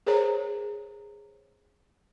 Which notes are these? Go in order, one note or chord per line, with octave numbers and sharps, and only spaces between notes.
G#4 A#4 C5 C#5 A#5